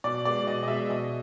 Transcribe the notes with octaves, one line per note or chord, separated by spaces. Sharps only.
B2 D5
G#3 B3 D5
B2 D#5
D#5
G#3 B3 E5
B2 D#5